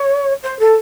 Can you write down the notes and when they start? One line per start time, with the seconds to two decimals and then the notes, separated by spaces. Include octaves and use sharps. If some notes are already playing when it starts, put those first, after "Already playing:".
Already playing: C#5
0.43 C5
0.59 A4